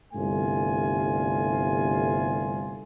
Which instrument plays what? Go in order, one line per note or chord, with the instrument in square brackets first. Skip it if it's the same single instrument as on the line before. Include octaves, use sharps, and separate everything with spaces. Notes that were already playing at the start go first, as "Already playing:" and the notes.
[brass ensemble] G1 C2 G2 A3 F4 G#5